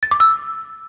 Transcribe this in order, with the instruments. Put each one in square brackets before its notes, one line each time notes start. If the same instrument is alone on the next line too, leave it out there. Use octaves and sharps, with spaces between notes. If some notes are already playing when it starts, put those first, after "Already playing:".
[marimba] A6
D6
E6